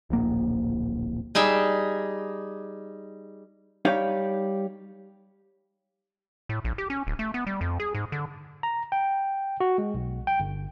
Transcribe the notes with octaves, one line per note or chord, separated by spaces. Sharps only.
D1 A#1 A#3
G3 D#4 G#4 E5
G3 D#4 C#5 F5
A2
A#1
G4
C#4
D1
A3
B3
G3
F2
G#4
G#2
D3
A#5
G5
F#4
G#3
B1
G5
G1